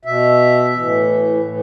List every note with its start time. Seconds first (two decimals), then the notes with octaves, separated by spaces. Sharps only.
0.05 B2 E5
0.74 A2 E3
1.43 A2 E3